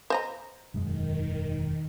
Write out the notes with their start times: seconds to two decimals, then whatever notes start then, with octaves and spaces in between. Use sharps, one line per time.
0.10 C5 D#5 A#5
0.74 E1 F#2 D#3 G#3